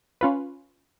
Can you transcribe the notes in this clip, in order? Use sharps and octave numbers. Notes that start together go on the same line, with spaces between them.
C#4 F4 B4